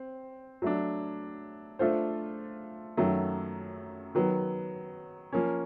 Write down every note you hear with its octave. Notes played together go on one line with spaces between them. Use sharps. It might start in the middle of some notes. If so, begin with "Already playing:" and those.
Already playing: C4
F#3 A3 D4
A3 D4 F4 A4 C5
F#2 D#3 F#3 A3
D#3 F#3 B3
F3 A#3 C#4